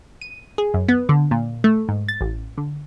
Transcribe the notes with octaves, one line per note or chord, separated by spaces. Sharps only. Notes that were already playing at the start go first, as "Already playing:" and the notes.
D#7
G#4
F#2
B3
D3
A#2
A3
G#2
A6
A1
D3